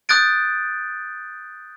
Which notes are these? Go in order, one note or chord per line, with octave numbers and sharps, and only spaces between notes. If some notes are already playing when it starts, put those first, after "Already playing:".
D#6 F#6 G6 A6 D7